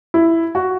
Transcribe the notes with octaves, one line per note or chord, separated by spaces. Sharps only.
E4
F#4